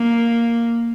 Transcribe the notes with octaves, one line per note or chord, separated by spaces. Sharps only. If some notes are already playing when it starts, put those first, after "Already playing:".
Already playing: A#3